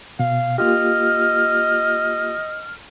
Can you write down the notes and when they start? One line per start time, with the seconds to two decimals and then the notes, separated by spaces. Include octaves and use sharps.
0.19 B2 F5
0.58 A#3 F4 G4 D#5 F6